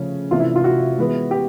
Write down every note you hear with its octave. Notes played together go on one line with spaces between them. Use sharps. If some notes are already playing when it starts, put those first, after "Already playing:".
Already playing: C#3 F3 A3 C#4
C3 E3 A3 D4 F4
E4
F4
F#4
E3 G#3 B3
G4